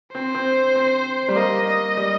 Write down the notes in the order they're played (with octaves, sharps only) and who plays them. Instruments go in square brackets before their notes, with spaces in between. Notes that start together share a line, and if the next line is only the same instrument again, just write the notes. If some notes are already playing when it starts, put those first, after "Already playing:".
[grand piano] C4 [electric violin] C5
[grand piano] C4
C4
G3
[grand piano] A#3 [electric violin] D#5
[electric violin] D#5
[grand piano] G3